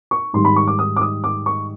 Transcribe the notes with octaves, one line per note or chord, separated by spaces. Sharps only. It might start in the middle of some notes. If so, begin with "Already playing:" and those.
C#6
G#2 D#3 G3 C6
B5
C#6
D6
D#6
D6
D#6
D6
C#6